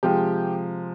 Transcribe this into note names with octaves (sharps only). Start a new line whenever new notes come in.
C3 F3 G#3 G4